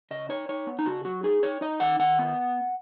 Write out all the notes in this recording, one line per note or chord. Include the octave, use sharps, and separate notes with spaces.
C#3 D#5
D#4 C#5
D#4 C#5
B3
D#4
C#3 F#4
F#3 F#4
D#4 G#4
D#4 C#5
D#4 D#5
D#3 F#5
D#3 F#5
B3